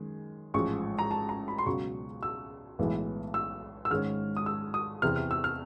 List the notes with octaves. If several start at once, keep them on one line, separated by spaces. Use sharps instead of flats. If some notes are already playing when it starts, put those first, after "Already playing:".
Already playing: F#2 D#3 G#3
A1 G#2 F3 G#3 C#6
A#5
A5
A#5
B5
C6
C#2 B2 F#3 C#6
E6
B1 A2 E3 G#3 B3
E6
E6
G#2 D#3 G#3 C#4 F6
D#6
E6
D#6
E2 C3 E3 F6
F6
E6
F6